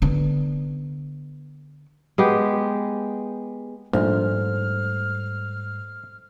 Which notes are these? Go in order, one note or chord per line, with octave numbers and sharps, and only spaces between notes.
D3 B3
G#3 B3 G4
A#1 G#2 G3 A3 D#4 A4 C5 F6